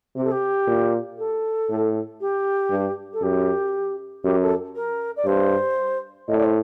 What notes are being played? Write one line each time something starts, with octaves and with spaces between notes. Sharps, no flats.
C3 G4
A4
G4
A#2
A4
A2
G4
G2
A4
F#2 G4
F#2 G4
A4
A#4
D5
G2 C5
A2 D#5
D5
C5